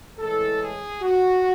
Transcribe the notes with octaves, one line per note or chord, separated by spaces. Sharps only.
A2 E3 G#3 C#4 A4
G#4
F#4